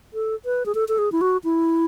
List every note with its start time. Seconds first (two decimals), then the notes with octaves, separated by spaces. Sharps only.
0.13 A4
0.45 B4
0.66 G#4
0.75 A4
0.88 A4
0.98 G#4
1.12 E4
1.21 F#4
1.44 E4